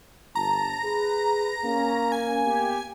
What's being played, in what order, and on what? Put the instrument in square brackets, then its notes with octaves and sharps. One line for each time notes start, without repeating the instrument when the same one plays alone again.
[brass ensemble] G1 A5 [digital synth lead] A#5
[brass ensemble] G#4 B4
[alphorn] A#3 [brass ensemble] C#4
[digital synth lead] G#5
[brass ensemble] B3 G4